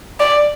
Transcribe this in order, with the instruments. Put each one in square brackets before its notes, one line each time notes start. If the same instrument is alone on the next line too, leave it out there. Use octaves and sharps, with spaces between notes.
[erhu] D5